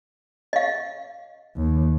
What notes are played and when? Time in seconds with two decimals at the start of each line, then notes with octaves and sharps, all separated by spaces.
0.53 D#5 F5
1.57 D#2